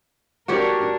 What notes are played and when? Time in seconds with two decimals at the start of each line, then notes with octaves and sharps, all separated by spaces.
0.48 D4 F#4 G4 A#4 C#5